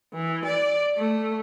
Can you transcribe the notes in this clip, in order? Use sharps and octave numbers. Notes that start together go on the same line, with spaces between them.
E3
D5
A3